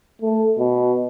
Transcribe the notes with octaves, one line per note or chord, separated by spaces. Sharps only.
A3
B2